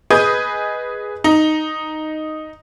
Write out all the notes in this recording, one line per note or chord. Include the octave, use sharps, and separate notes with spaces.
G#4 B4 D#5 D#6 G6
D#4